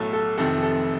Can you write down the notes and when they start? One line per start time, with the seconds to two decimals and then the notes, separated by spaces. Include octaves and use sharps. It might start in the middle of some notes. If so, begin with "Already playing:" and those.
Already playing: B1 A2 F#3 A3 A4
0.13 A4
0.38 F1 F2 C3 D#3 A4
0.63 A4